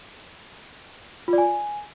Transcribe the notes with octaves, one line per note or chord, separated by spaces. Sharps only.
F4
D5
G#5